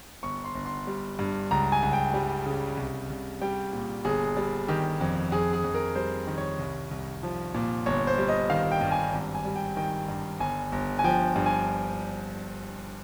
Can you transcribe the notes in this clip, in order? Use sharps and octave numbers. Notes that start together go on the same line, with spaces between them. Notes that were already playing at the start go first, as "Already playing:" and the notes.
G1 C#6
C6
G1
C6
G3
G2
C#2 A#5
G#5
C#2
G5
G3
C#3
C2
C2
G3 G5
A#2
G1 G#4
G3
D#3 G4
F2
F2 G#4
G#4
F2
A#4
G3 C5
D#3
C#5
C2
C2
F3
A#2
G1 C#5
C5
G3
D#5
D#3 F5
G5
G2
G#5
G#1
G#5
G3
G5
D#3 G5
G2
G1 G#5
G1
G#5
F3 G5
G2
G#5